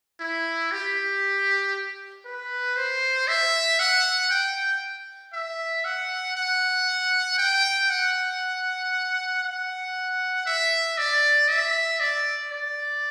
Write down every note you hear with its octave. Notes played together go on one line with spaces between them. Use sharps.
E4
G4
B4
C5
E5
F#5
G5
E5
F#5
F#5
G5
F#5
F#5
E5
D5
E5
D5
D5